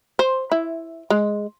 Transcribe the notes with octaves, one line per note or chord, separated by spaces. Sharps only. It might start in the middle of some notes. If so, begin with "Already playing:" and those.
C5
E4
G#3